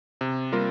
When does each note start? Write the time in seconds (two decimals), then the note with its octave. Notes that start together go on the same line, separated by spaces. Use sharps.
0.21 C3
0.52 G3 A#3 F4 A#4